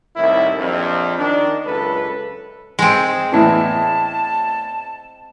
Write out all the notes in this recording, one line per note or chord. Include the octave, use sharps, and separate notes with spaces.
C2 A2 D#3 E4
A#1 F2
D#3 D4
C#2 F#2 A4 B4
G#3 C4 G#4
E2 A2 E3 A5